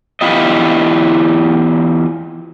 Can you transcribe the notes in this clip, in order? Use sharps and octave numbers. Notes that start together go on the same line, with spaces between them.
E2 E4 F4 G4 D#5